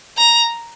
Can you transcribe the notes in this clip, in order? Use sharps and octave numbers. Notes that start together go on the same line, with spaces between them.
A#5